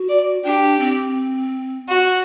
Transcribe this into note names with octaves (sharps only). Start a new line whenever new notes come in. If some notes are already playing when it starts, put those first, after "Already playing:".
Already playing: F#4
D5
D4 G4
C4
F#4